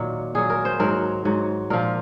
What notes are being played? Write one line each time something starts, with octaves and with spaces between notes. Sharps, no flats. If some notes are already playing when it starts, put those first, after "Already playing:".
Already playing: A#2 D#3 F#3
A#2 F#3 G#4
A#4
C5
G#2 F#3 A#4
G#2 F#3
A#2 F3 A#4